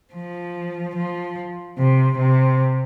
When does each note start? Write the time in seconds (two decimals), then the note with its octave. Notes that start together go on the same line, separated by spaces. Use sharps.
0.14 F3
0.96 F3
1.78 C3
2.18 C3